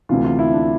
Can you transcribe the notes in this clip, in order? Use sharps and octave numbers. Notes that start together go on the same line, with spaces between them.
D2 C3 E3 F4
F4
E4
D4